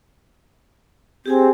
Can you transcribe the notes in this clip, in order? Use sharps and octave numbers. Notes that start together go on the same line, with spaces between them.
C4 G4 G#4 G#5